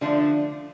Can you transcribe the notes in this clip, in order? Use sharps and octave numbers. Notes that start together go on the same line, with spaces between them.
D3 F3 A3 D4